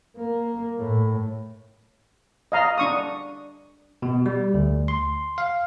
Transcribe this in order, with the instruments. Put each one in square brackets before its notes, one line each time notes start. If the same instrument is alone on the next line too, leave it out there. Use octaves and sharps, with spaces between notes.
[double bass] A#3
A2
[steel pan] D#5 F5 A#5
D4 C#6 D#6
[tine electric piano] B2
G3
D2
C6
F5